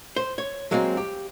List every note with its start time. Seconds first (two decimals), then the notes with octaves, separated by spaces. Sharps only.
0.16 C5
0.38 C#5
0.71 F#3 G#3 A#3 C4
0.97 G4